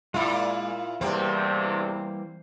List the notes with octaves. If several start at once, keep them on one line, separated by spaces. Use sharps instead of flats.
A#2 G#3 A#3 E4 F4 D5
E2 G2 C3 E3 G3 A#3 C4